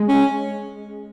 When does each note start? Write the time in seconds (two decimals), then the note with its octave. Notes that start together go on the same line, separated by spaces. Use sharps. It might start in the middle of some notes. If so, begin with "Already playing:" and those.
Already playing: G#3
0.08 C#4